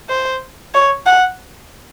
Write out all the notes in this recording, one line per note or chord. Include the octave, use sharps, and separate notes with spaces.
C5
C#5
F#5